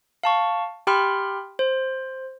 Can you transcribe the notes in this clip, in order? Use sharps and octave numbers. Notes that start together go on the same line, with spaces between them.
F5 A5 C#6
G4 G5 B5 C6 F6
C5